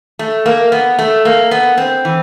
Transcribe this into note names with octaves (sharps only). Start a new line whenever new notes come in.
A3
A#3
B3
A3
A#3
B3
C4
E3